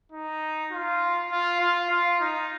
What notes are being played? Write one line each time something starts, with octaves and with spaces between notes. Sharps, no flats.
D#4
F4
F4
F4
F4
D#4